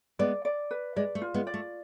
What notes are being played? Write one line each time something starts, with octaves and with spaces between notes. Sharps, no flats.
G#3 B3 D5
D5
B4
G#3 D5
A3
F4
G#3 B3
D5
A3